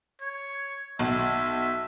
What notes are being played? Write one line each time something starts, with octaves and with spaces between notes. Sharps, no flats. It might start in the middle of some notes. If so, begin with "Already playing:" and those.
C#5
B1 E5